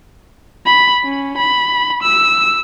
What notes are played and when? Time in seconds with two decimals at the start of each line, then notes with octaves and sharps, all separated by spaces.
0.66 B5
1.04 C#4
1.38 B5
2.03 E6